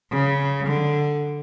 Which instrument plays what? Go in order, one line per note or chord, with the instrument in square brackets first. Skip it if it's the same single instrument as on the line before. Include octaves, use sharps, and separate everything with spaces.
[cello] C#3
D3